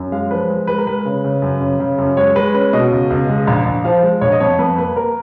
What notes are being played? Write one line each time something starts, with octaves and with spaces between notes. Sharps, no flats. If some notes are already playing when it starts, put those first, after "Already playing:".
Already playing: F#2
G#3 F5
F3 B4
G#3
G#3 B4
A#4
G#3 B4
C#3
C#3
F#2
C#3
C#3
F#2
G#3 C#5
G#3 B4
C#4 B4
B2 D#5
C#2
C#2
G#3
A#1
A#1
F3 F5
G#3
A#1 C#5
D#5
F2 C#5
F2 B4
A#3 B4
A#3 A#4